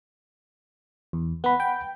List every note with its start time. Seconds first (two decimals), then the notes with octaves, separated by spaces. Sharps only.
1.13 E2
1.44 B3 F#5 B5
1.60 G5